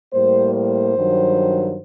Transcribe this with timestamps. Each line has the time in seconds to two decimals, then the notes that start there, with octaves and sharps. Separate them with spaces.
0.13 A2 G3 A#3 C5
0.54 C5
0.96 G2 D#3 F#3